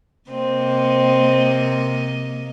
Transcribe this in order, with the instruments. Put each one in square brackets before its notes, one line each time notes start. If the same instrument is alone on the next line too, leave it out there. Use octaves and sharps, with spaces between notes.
[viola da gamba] C3 A#3 D#5 [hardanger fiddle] C4